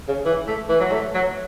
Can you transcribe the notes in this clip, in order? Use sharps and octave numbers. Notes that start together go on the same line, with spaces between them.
C#3
E3
A3
E3
F#3
A3
F#3